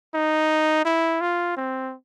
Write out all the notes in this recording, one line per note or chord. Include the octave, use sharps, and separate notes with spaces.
D#4
E4
F4
C4